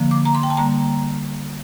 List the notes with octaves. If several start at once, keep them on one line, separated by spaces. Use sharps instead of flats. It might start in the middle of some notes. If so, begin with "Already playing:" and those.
Already playing: D3 F3 A#3
D6
A#5
C6
G5
A5
D3 G3 A#3 A#5